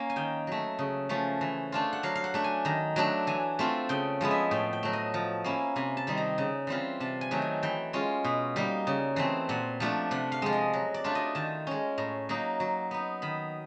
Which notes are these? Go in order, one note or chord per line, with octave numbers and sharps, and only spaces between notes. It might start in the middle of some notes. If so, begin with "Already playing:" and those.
Already playing: A#3 C#4
G#5
D#3 G5
F#3 A3
C#3
F3 A3 C#4
E3
A3 D4 F4
F#5
F#3 F5
F5
F#5
A3 D4
G#5
D#3 A#5
F#3 A3 D4
E3 G#5
A3 C4 F4
C#3 G5
F3 G#3 B3 E4
E5
A2 G5
G5
F#3 A3
D#5
F3
A#3 C#4 E4
C3 G#5
A5
D#3 G3 C4 D#4
A#5
C#3
E3 G3 C4 F4
C3 A5
G#5
D#3 F#3 A3
G#5
E3 G5
G#3 C#4 F4
B2
G3 A#3 D#4
C#3
E3 A3 C4
A#2 F#5
F3 A3 D4
C3 F#5
F5
F3 G#3
D#5
F#3
D5
A3 D4 F4
D#5
D#3 A5
G#3 C#4
A2 A#5
F#3 A#3 D#4
F#3
B3 D#4
D#3 B5